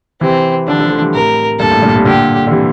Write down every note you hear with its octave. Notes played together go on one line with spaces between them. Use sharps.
C3 E3 C4
D3 F3 D4
D3 F3
F3 A3
E3 G3
A2 C3 A#4
G2 A#2 A4
A2
G2 A#2
A2 C3
A#2 D3 G4
D3
C3 E3